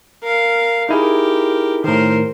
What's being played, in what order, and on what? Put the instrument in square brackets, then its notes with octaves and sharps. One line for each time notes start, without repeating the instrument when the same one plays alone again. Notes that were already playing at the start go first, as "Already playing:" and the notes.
[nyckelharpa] A#4 F5
[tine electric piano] D#4 E4 G#4 [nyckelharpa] G4 A#4
[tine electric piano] A2 D#3 [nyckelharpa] A#4 C5